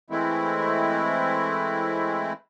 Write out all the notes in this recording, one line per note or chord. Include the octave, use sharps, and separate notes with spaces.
E3 G#3 A3 C4 E4